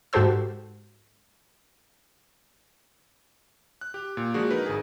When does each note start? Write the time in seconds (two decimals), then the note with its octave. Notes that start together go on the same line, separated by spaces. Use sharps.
0.13 G#2 F#4 G4 A4 C5 E6
3.81 F#6
3.94 G4
4.17 A#2
4.34 F3 G#3 A#3 D4 F#4 G#4
4.51 D#4 A#4 B4
4.66 G#1 G#4